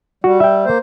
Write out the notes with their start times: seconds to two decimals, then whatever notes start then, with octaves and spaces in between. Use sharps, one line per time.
0.24 G3 F#4
0.40 E5 G5
0.65 A#3 C5